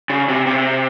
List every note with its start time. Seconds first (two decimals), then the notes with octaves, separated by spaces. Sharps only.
0.10 C#3
0.29 C3
0.47 C3